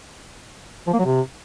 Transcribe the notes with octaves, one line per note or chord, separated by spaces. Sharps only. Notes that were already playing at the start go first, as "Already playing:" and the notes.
F3
A#3
F#3
C3